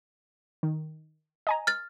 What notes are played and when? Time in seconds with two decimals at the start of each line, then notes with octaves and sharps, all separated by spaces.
0.63 D#3
1.47 D#5 G#5 A#5
1.67 F6 A6